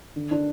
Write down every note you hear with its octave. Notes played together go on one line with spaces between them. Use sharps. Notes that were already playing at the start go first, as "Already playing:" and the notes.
D3
D3 D4